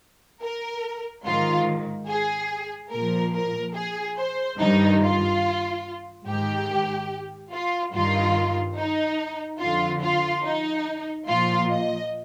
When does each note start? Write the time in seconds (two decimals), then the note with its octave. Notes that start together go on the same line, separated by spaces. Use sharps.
0.42 A#4
1.25 G#2 D#3 F4
2.08 G#4
2.92 A#2 F3 A#4
3.34 A#4
3.75 G#4
4.18 C5
4.59 G2 D#3 D#4
5.02 F4
6.27 G#2 D#3 G4
7.52 F4
7.93 G2 D#3 F4
8.78 D#4
9.60 F2 D3 F3 F4
10.02 F4
10.44 D#4
11.27 A#2 F3 F4
11.70 D#5